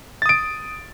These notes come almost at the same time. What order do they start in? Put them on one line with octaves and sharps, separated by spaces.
A6 D#6 D7